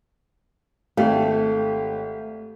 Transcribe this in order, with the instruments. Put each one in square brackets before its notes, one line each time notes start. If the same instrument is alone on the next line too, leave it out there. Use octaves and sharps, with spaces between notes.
[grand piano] G#1 G4 F5 [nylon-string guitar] A3